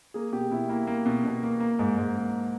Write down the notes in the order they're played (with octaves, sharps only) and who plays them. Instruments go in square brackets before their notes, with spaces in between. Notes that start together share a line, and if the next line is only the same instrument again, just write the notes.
[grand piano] A#3 G#4
B2 G4
B2 E4
A#3 E4
A#3
B2
B2
A#3
A#3
G#2
G#2
A#3